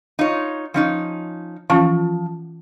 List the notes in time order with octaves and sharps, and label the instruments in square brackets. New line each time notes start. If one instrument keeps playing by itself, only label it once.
[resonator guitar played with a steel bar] D#4 F4 C#5
F3 C#4 D#4
[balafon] E3 C#4 F4 [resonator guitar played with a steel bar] F3